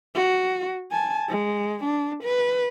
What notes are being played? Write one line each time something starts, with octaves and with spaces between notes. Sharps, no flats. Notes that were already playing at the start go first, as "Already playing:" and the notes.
F#4
G#5 A5
G#3
D4
B4